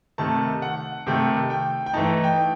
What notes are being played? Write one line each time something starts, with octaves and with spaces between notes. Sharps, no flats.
C3 D#3 A3 A5
F#5
C3 D#3 A3 G5
G5
G5
E3 A3 D#4 A5
G5